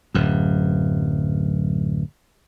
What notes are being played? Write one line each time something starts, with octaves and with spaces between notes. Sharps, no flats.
D1 F#2